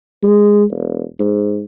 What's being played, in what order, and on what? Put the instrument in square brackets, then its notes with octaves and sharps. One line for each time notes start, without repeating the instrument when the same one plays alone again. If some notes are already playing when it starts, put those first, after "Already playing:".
[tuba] G#3
E1
G#2